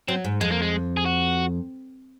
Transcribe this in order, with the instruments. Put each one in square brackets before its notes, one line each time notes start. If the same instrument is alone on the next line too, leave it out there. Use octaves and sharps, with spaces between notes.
[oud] F#3 [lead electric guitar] C4
[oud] G#2
[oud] F2 [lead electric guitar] G#3
[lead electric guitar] A#3
G#3
G#4
F#4